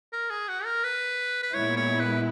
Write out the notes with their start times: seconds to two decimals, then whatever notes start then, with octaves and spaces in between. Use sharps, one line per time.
0.13 A#4
0.30 G#4
0.48 F#4
0.65 A#4
0.84 B4
1.43 B4
1.54 A#2 G#3 B3 E4 C#5
1.77 C#5
2.00 B4